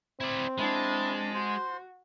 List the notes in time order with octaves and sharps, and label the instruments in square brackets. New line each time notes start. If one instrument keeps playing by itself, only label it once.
[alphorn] C4 [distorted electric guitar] E4 D5
[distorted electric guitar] G#3 [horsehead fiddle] D4 A5 [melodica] E4
[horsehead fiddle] F#4 [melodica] C5 C6